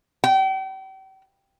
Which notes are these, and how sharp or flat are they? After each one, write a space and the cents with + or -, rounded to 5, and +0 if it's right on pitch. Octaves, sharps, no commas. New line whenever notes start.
G5 -40